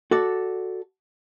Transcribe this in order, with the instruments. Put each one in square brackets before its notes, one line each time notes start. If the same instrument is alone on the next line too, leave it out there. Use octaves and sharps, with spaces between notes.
[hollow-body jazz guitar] F#4 A4 D5